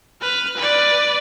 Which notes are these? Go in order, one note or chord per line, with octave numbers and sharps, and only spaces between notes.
B4 F6
B4 D5